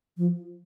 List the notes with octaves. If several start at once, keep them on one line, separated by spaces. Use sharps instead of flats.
F3